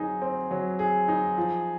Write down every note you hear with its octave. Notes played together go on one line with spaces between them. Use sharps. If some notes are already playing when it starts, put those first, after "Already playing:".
Already playing: F#3 C4 D#4 G#4
C4
F#3
G#4
D#4
F3